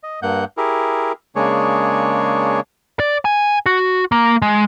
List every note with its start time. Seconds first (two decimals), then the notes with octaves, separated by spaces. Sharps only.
0.03 D#5
0.22 G2 A#3 F#5 G6
0.57 E4 G4 G#4 A#4
1.36 C#3 G#3 A#3 D4 G#4 C#5
3.00 D5
3.25 G#5
3.66 F#4
4.12 A#3
4.42 G#3